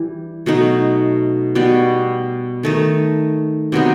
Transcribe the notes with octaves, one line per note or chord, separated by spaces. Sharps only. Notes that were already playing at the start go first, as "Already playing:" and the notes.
Already playing: E3 G3
B2 F#3 A3 D#4
B2 G3 B3 F#4
D#3 A3 D#4
C3 F#3 B3 D#4